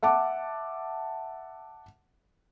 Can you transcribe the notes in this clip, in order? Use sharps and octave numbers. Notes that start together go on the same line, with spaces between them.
E5 F#5 A5 D6